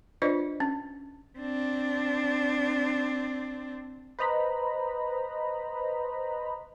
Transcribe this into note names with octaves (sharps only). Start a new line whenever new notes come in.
D4 F4 B4 C5 D5 D#5
C#4
C4 D4
B4 C5 D#5 A#5 B5